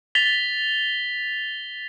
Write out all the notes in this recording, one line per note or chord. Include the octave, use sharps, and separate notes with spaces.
A6 B6 F7 G7